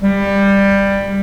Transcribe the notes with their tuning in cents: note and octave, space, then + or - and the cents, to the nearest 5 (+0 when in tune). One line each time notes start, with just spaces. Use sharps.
G3 +15